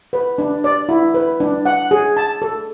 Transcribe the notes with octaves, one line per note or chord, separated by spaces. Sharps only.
B4
D4
D5
E4
B4
D4
F#5
G#4
A5
A4